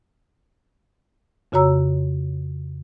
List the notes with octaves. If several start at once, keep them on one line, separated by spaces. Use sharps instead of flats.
F2 C#3 F#4 C#5 A#5 E6